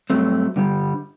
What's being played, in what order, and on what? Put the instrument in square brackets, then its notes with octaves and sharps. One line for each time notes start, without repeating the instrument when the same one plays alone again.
[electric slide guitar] G2 F#3 A3 C4
G2 D3 G3